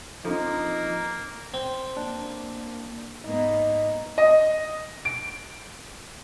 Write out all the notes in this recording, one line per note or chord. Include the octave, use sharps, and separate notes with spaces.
F3 A#3 C4 D4 D#4 A4
C4
A#3 D4
G#2 A#3 B3 D#4
D#5
D7